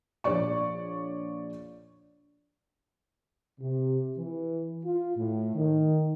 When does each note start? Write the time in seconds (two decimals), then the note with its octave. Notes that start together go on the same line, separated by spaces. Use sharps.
0.24 A#1 C#5 D5 C#6
3.60 C3
4.18 E3
4.84 F4
5.16 A2
5.55 D#3